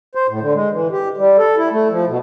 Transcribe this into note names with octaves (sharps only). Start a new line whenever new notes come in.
C5
A2
D3
G#3
E3
G4
G3
A4
E4
A3
F3
B2